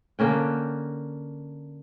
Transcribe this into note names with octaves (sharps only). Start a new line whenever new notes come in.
D3 A#3 C#4 G5